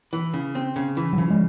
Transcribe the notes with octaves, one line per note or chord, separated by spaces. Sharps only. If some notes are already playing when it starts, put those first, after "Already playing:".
E3
C#3
C4
C#3
E3
F#3
C#3 F3
G#3